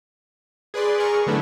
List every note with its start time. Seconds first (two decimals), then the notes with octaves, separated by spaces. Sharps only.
0.74 G#4 B4 D5 C6
1.00 G#4 A#4 C#6
1.27 D3 F#3 A3 B3 D4 E4